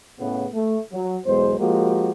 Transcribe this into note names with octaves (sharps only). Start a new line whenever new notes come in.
A2 C#3 B3
A3
F#3
B1 E2 G#3 C5
F3 G#3 A#3 F#4 G4 A#4